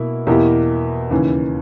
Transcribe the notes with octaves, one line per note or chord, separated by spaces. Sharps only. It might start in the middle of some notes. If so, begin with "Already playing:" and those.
Already playing: B2 A#3 E4
E2 B2 A#3 E4 G4
D#2 C#3 E3